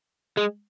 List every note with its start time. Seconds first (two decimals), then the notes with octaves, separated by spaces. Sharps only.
0.37 G#3